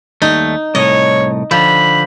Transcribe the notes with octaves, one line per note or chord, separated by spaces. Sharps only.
D#2 G3 A3 D#4
C2 A2 C#5 D#5
D3 F3 B5